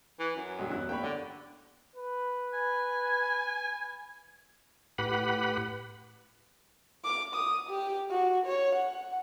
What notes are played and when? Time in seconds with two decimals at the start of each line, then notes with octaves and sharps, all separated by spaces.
0.20 E3
0.36 F#2
0.59 B1 G2
0.70 E1 C#4 E4 F#6
0.89 A#3 G4 C#5 G5 B5
1.03 D3 D5 F#5
1.96 B4
2.53 G#5
4.98 A2 G4 B4 F#5 B5
7.05 D6
7.35 D#6
7.69 G4
8.11 F#4
8.46 C#5
8.75 F#5